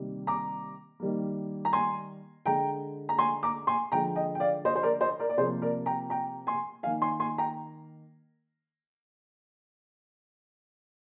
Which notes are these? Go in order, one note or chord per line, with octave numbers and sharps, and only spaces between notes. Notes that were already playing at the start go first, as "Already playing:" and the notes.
Already playing: C3 D#3 G3 A#3
A#5 D6
D#3 G3 A#3
A#5
G#5 C6
D3 G#3 G5 A#5
A#5
G#5 C6
A#5 D6
G#5 C6
D3 F3 G#3 G5 A#5
D#5 G5
G5
D5 F5
C5 D#5
C5
A#4 D5
C5 D#5
A#4 D5
D5
C3 F3 A#3 G#4 C5
A#4 D5
G5 A#5
G5 A#5
G#5 C6
D#3 A#3 F5 G#5
G#5 C6
G#5 C6
G5 A#5